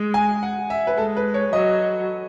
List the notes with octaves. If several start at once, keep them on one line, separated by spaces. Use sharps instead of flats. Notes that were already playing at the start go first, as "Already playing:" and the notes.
Already playing: G#3
G#5
F#5
E5
B4
G#3 A4
B4
C#5
F#3 D#5